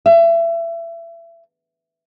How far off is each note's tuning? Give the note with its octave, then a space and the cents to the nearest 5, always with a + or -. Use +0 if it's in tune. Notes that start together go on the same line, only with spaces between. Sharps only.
E5 +30